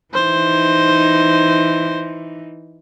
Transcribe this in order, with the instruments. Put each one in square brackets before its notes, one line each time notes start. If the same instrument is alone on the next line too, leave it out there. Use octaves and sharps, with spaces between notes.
[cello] E3 D#4 [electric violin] C5